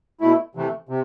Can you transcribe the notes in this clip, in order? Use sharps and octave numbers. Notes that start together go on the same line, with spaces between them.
B2 A3 E4
C3 E3 A3
C3